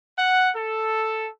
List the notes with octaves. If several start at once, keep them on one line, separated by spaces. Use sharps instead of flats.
F#5
A4